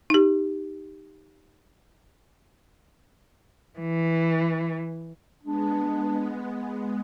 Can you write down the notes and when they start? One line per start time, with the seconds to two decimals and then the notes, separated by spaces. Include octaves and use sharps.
0.10 D#4 G4
3.79 E3
5.43 G#3 B3 D4